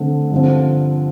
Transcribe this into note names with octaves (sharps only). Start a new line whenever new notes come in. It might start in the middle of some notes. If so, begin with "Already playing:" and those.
Already playing: D3 A3 C4
G2 D3 F3 C4